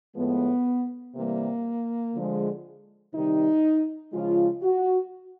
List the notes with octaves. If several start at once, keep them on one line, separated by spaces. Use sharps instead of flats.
A2 F3 G#3 B3
C3 E3 G3 A#3
D3 F3 G#3
C3 D#3 G3 D#4
C#3 F3 G#3 F4
F#4